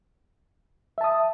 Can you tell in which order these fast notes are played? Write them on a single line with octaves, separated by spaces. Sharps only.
E5 A5 D#6